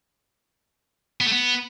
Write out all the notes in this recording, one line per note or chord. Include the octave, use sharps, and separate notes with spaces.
B3
A3
B3